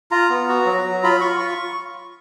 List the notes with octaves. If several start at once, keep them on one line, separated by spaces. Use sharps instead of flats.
F4 A#5
B3
F#4
F#3
F#3
F4 B5
F4 C#6
F4 C#6